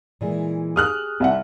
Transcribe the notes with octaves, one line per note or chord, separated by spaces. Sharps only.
A#2 E3 G#3
G4 G#4 G5 D#6 F6 F#6
C2 E5 F#5